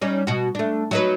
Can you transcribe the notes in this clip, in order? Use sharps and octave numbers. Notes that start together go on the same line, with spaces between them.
G3 C#4 D#4
B2 F#4
A3 D4
F#3 D#4 B4